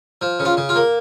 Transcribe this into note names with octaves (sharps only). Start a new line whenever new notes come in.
F3
C#3
F4
C#3
F4
A#3